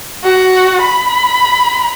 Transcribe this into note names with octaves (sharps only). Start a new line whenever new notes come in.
F#4
B5